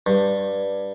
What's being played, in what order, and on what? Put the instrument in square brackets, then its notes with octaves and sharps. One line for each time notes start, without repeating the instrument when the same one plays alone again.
[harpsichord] G2